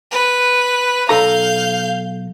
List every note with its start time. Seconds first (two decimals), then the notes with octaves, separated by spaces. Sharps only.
0.12 B4
1.09 B1 A4 F5 A#5 G6